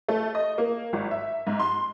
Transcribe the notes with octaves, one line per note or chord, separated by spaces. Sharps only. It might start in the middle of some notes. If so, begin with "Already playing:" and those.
A3
D#5
A#3
G#1
E5
G#2
C6